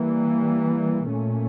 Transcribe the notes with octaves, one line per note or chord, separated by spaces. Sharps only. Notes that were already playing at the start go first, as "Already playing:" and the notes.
Already playing: E3 G3 A#3
A#2 A3 C#4